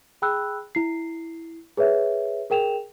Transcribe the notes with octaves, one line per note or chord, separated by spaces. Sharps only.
G#4 G5 B5 E6 F#6
E4 C7
G#4 B4 C#5 E5
G#4 A#4 G5 E7 F7